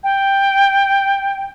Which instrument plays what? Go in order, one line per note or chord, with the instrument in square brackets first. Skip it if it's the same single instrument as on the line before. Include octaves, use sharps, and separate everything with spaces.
[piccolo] G5